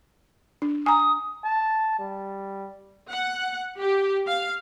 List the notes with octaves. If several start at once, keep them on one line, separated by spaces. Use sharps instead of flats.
D4
G#5 A#5 D#6
A5
G3
F#5
G4
F5